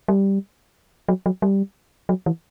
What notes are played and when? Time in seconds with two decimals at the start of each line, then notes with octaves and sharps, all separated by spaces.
0.08 G3
1.09 F#3
1.26 F#3
1.42 G3
2.09 F#3
2.26 E3